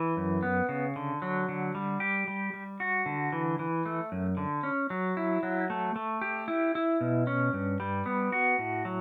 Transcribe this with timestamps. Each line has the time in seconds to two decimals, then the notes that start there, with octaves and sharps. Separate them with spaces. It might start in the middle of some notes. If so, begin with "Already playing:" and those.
Already playing: E3
0.17 F#2
0.43 B3
0.69 C#3
0.96 D3
1.22 F#3
1.49 D3
1.75 G3
2.00 G4
2.28 G3
2.54 G3
2.80 F#4
3.06 D3
3.32 E3
3.59 E3
3.86 A3
4.12 F#2
4.37 D3
4.63 C#4
4.90 F#3
5.17 E4
5.43 F#3
5.70 A3
5.96 A3
6.21 G4
6.48 E4
6.75 E4
7.01 B2
7.27 C#4
7.53 G2
7.80 G3
8.06 B3
8.32 F#4
8.59 A2
8.85 F#3